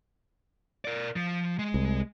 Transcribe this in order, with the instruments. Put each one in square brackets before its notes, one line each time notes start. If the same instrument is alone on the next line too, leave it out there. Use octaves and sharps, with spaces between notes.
[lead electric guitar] A#4 D5
F3
G#3
[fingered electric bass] C2